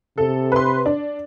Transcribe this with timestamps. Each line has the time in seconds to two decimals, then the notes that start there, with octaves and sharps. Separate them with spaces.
0.18 C3 A4
0.52 B4 C6
0.86 D4